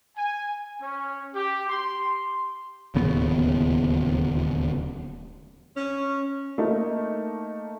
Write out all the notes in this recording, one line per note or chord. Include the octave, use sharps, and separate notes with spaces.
G#5
C#4
G4
C6
D1 D#2 C#3 B3
C#4
A3 A#3 D#4